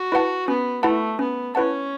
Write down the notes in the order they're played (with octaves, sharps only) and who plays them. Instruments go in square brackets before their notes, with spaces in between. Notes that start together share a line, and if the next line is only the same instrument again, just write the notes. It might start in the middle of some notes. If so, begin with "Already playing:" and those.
Already playing: [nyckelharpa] F#4
[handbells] E4 B4 F#5 A5
[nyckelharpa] B3 [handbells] C#4
[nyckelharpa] A3 [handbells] E4 B4 F#5 A5
[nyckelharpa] B3 [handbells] C#4
[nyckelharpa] C#4 [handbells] E4 B4 F#5 A5